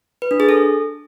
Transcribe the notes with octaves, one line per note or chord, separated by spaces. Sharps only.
B4
D4
G#4
A4